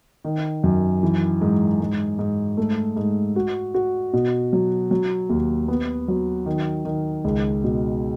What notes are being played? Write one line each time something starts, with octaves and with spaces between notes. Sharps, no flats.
D#3
F#2
E3
G#2
G#2
G#2
A3
G#2
F#4
F#4
B2
F#3
F#3
D#2
B3
F#3
D#3
D#3
C#2
B2